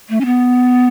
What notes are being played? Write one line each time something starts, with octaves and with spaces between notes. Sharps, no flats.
A3
C#4
B3